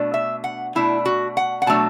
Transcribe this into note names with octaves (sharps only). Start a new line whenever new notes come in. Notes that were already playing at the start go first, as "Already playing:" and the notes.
Already playing: B2 A3 D4
E5
F#5
B2 A3 D4 E4
F#4
F#5
F#5
B2 F#3 A3 D4 A5